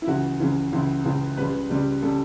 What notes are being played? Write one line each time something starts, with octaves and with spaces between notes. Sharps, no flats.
E4
C#2 C#3 E3 F#4
C#2 C#3 E3
C#2 C#3 E3 E4
C#2 C#3 E3
C#2 C#3 G3 B4
C#2 C#3 G3
C#3 G3 A4